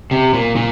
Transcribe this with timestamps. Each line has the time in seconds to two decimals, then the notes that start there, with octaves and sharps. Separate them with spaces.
0.11 C3
0.34 A#2
0.56 A#2